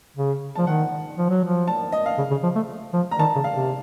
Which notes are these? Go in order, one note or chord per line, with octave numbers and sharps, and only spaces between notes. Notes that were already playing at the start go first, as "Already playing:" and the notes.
C#3
F3 A5
D#3 F#5
F3
F#3
F3
A5
D#5
F5
C#3
C#3
F3
A3
F3
A#5
D#3 A5
C#3
F5
C3